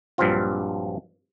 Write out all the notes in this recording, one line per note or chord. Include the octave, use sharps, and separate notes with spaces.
A#1 G2 F3 F#3 C4 F4